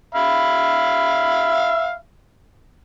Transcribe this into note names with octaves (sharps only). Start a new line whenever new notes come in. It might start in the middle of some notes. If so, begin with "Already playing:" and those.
E5 F5 B5